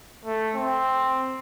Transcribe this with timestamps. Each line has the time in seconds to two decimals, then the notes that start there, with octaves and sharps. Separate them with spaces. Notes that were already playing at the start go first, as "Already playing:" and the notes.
0.25 A3
0.55 C4